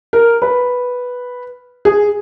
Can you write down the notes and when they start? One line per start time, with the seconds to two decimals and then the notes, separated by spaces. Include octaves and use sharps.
0.13 A#4
0.42 B4
1.85 G#4